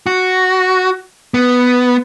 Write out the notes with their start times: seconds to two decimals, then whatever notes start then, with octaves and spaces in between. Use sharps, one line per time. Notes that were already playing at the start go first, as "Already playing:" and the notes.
0.06 F#4
1.34 B3